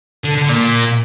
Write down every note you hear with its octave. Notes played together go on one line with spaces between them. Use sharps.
D3
D3
A#2